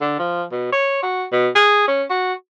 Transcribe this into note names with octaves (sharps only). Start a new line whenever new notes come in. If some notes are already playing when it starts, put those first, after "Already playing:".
D3
F3
B2
C#5
F#4
B2
G#4
C#4
F#4